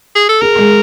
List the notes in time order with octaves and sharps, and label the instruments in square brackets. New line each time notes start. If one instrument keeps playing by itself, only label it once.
[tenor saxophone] G#4
A4
[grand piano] G#4 [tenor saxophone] A#4
[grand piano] G#3